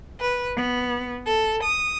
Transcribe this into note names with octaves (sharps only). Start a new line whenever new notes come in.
B4
B3
A4
D#6